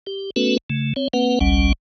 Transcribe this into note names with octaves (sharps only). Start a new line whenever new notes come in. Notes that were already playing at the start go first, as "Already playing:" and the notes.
G4
A3 B3 C#4 F#4 A4 B4
C#3 A3
C4 C#5
A#3 C4 B4 F#5
G#1 C#2 G3 C#4 F#5